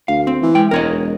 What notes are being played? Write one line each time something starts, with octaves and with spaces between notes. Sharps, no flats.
D2 F5
C4
E3
G#3 G5
E1 A#4 C#5 D#5